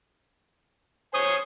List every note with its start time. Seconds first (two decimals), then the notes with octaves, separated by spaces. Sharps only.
1.14 C5 C#5 G#5 D#6